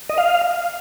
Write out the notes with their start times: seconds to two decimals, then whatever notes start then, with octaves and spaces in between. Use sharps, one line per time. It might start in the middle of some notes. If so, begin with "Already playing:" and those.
0.09 D#5
0.18 F5